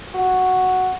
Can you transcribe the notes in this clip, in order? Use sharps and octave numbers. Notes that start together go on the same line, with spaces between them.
F#4